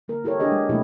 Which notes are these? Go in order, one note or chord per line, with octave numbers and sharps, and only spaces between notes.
D3 A#3 A#4
E4 G4 A4 A#4 C#5
D4 G4 G#4 D#5
G#3
B2 F#3 A3 A#3 E4 G4